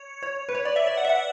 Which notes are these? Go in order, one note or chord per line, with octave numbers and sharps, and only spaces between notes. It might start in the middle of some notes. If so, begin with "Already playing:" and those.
Already playing: C#5
C#5
B4
C#5
D5
E5
D5
F#5
E5
F#5